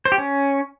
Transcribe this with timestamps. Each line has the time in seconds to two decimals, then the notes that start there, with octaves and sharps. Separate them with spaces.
0.05 C5
0.12 G4
0.18 C#4